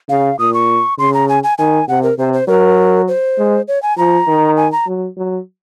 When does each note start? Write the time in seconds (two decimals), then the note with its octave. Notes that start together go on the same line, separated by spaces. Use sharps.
0.09 C#3 F5
0.39 A#2 D#6
0.54 C#6
0.99 C#3 C6
1.14 A#5
1.29 G#5
1.43 G#5
1.58 D#3 G#5
1.88 C3 F#5
2.03 A#4
2.18 C3 C5
2.33 C5
2.48 F#3 A#4
3.08 C5
3.38 G#3
3.68 C#5
3.83 G#5
3.98 F3 A#5
4.27 D#3
4.57 G#5
4.72 A#5
4.87 F#3
5.17 F#3